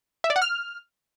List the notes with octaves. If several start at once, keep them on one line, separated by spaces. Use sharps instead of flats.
E5
D5
F#5
F6